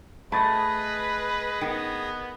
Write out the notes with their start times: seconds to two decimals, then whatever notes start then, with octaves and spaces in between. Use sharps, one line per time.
0.32 A3 G#4 B4 D#5 B5 A6
1.61 D#3 B3